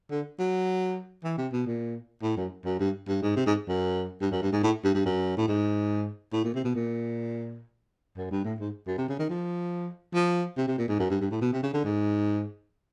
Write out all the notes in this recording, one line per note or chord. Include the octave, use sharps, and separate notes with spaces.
D3
F#3
E3
C3
B2
A#2
A2
F#2
F#2
G2
G2
G#2
C3
G#2
F#2
G2
F#2
G2
G#2
A2
G2
G2
F#2
A2
G#2
A2
A#2
C3
B2
A#2
F#2
G2
A2
G#2
F#2
C3
C#3
D#3
F3
F3
C3
C3
A#2
G#2
F#2
G2
G2
A2
B2
C3
C#3
D3
G#2